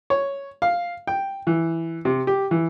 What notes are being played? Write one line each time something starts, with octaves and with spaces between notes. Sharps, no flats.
C#5
F5
G5
E3
C3
G4
E3